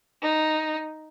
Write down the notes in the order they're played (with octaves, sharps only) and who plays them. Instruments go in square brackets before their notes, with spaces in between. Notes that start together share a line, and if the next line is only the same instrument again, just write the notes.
[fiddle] D#4